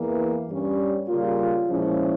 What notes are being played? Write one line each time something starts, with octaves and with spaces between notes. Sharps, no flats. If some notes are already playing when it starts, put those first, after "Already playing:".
Already playing: E2 E3 A#3
G2 G3 C#4
C#3 G3 A#3 F4
A#2 F3 G#3 C#4 E4